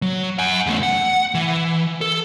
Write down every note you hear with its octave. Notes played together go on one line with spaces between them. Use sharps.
F#3
F#5 G#5
E2 A3
F#5
E3
A4